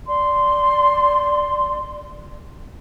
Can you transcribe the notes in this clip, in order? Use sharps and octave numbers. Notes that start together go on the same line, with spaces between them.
D5 C6